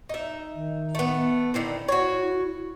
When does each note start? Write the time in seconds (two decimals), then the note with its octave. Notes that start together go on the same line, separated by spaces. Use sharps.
0.09 D#4 E5
0.55 D#3
0.95 A3 B3
1.54 D3 D#3 C4 E4
1.88 F#4 C#5